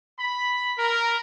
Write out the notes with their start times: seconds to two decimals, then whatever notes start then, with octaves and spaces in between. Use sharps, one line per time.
0.19 B5
0.78 A#4